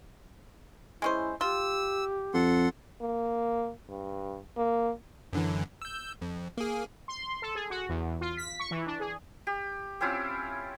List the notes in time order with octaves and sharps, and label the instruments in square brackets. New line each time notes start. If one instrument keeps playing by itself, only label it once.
[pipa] G#3 C#4 C5 [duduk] E4
[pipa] F4 [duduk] G4 [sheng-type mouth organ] E6
[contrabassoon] F2 [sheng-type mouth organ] A4 F#5 C6
[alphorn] A#3
G2
A#3
[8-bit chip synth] F#2 D3 E3
E6 G6
F2
A#3 G#4
[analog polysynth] C6
A4
G#4
F#4
E2
F4
B6
C#6
E3
D4
G#4
[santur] G4
C4 C#4 E4 F4